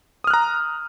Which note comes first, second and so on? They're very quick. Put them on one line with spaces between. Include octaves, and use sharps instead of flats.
D#6 F6 F#6 A#5